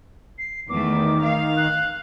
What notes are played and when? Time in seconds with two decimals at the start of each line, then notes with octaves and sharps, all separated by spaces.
0.38 C7
0.69 E2 D#3 A3 D6
1.25 F5
1.57 F#6